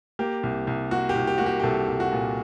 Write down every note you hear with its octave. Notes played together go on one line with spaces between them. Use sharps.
A#3 G4
C2
C2
A#3 F#4
G4
C2
G4
A#3 F#4
G4
G4
C2 A4
C2
F#4
A#2